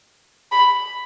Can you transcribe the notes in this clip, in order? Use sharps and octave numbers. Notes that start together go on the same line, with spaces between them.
B5